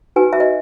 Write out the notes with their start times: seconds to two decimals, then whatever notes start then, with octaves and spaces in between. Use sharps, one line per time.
0.16 D#4 F#4 B4 G#5
0.33 E5
0.40 D#5